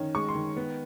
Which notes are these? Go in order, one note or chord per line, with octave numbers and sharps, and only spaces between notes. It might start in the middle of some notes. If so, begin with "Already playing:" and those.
Already playing: D#3 C#4
G#3 C#6
C6
D#3
B3